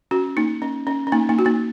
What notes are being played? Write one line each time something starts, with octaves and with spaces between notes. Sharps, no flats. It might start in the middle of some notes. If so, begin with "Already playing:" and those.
C#4 F#4
A#3 D#4
C#4
C#4
C#4
A#3 D#4
A#3 D#4
F#4
A#3 D#4